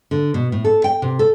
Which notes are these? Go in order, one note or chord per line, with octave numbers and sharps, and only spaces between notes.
D3
B2
A2
A4
G5
C3
A4